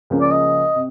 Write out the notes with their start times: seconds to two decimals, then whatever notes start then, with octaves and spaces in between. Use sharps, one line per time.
0.10 C#2 C#3 F3 A#3 C#4
0.21 D5
0.31 D#5
0.75 C3